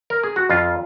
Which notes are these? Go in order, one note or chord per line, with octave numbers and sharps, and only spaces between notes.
A#4
G#4
F#4
F2 F4